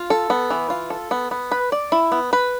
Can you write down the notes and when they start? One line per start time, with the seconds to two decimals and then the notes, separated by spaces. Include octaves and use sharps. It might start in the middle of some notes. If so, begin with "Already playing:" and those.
Already playing: F4
0.10 A4
0.30 B3
0.50 E3
0.70 F4
0.90 A4
1.11 B3
1.31 B3
1.51 B4
1.72 D5
1.92 E4
2.12 B3
2.33 B4